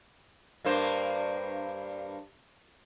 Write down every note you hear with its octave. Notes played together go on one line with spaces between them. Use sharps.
G2 A#3 C5